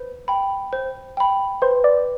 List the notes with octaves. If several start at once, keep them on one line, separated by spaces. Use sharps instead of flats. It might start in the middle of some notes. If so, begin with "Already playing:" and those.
Already playing: B4 C5
G5 B5
C5
G5 B5
B4 C5
D5